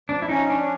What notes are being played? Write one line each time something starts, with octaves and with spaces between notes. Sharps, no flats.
F3 D4
E4
C#4 D#4
F3 D4